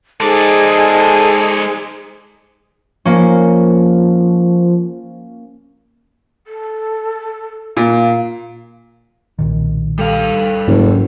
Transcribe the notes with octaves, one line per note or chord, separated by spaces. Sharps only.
G#3 D#4 G#4 A4 C5 D5
F3 A#3 C#4
A4
A#2 F5
B1 A#2 D#3
G3 A4 F5
F#1 G#2 F#3